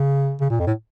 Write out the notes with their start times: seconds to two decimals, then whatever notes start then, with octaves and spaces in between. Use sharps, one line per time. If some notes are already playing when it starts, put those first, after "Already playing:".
Already playing: C#3
0.41 C#3
0.50 A#2
0.59 F2
0.67 A2